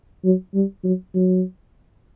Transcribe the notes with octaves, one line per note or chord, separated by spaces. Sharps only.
F#3
G3
F#3
F#3